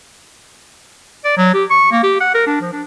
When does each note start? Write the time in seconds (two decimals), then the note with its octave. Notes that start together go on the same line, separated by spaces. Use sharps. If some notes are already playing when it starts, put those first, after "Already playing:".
1.24 D5
1.37 F#3
1.54 G4
1.70 C#6
1.92 A#3
2.03 G4
2.20 F#5
2.34 A#4
2.47 D4
2.61 F3
2.72 D4